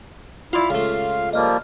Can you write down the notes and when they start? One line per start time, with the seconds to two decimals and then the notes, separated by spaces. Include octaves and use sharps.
0.53 E4 F4 D5 F5 C6
0.70 C#2 A3 F5
1.33 F3 G3 A#3 D#5 F6